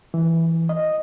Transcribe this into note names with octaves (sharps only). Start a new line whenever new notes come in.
E3
D#5